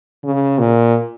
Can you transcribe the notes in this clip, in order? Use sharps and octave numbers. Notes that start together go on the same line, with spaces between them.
C#3
A#2